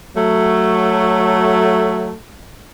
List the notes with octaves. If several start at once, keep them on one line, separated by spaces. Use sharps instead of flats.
F#3 A3